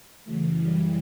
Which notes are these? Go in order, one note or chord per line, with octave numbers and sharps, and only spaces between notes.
F#2 C#3 E3 F#3 A3
G3